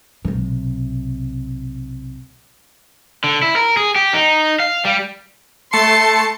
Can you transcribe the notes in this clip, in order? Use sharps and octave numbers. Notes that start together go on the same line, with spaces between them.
B1 C3
D3
E4
A#4
G#4
G4
D#4
F5
G3
A3 A5 C6 C#7